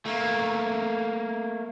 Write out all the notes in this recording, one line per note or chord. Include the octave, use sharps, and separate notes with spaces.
A3 A#3